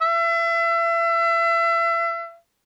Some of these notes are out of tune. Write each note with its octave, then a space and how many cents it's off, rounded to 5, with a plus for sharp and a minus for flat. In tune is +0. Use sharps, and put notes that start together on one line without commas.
E5 +35